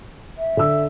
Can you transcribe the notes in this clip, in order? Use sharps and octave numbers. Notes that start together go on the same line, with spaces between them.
E5
D3 E6